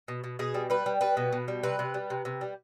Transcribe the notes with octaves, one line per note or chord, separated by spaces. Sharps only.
B2
B2
B2 G#4
G3
G3 B4
G3
G3 B4
B2
B2
G3
C3 B4
C3
G3
C3
C3
G3